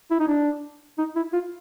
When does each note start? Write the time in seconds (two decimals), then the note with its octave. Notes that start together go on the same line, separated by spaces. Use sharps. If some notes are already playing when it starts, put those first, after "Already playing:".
0.11 E4
0.20 D#4
0.28 D4
0.98 D#4
1.16 E4
1.33 F4